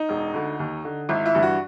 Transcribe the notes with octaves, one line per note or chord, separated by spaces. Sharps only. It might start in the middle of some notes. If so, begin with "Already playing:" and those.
Already playing: D#4
E1
D2 D3
D#2
D3
G#1 E4
E4
G2 E3
F#4